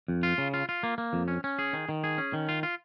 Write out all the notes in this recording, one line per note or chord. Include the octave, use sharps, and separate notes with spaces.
F2
F4
C#3
F4
F4
A#3
A#3
F2
C#4
C#4
G#4
D#3
D#3
G#4
C#4
D#3
F4
F4